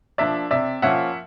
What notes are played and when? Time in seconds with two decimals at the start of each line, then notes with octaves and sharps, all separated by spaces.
0.18 F3 A#3 D4 D5 E5
0.51 C3 D5 E5
0.82 F3 A#3 C#4 E5 F#5